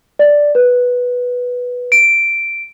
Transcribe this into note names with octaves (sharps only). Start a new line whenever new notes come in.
D5
B4
D7